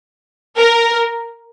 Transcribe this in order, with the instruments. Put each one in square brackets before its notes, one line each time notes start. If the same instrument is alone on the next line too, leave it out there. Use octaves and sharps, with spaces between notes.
[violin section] A#4